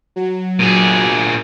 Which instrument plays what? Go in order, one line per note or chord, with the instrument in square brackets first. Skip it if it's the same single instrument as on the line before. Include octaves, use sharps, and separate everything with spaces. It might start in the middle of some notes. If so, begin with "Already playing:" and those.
[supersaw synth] F#3
[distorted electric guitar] A#2 G#4